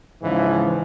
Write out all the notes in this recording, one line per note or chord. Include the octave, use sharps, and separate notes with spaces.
G#2 C#3 E3 F3